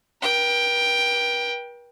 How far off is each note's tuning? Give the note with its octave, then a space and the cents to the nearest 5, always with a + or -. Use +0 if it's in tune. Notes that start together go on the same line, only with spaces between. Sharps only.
B4 -45 G5 +10